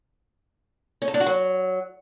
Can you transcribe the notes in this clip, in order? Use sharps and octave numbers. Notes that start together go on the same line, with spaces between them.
C#4
A4
D4
F#4
F#3